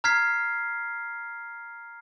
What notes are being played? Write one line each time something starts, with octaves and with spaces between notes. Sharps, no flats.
A#5 F6 G#6 B6 C7